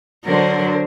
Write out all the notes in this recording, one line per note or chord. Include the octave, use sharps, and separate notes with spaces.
D3 F#3 A#4 C5